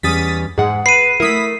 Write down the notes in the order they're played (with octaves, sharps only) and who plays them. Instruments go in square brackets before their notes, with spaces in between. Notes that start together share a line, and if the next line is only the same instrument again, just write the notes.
[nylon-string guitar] E2 G3 C#4 [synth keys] D#6 A6 B6
[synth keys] G#2 [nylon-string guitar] G#4 F#5
[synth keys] B4 [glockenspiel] C7 D#7
[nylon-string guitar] A3 A#4 [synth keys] E4 D#6 B6